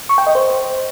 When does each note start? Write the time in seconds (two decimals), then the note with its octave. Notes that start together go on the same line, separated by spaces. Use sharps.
0.09 C#6
0.18 G5
0.27 D#5
0.35 C5